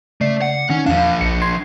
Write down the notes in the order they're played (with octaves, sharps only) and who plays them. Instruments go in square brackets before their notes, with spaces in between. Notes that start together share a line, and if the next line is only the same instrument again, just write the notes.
[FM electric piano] C#3 D5 C7 [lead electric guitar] A3
[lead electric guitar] F#5
[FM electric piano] D#3 [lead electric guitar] C#4
[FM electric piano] E2 F5 [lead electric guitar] F3 D4
[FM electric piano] A#1 C#7
C6 G#6 C7